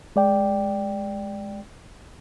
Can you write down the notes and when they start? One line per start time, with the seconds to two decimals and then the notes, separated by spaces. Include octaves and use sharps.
0.16 G#3 D5 G5